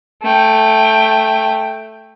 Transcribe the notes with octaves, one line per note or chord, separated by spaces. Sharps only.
A3 G5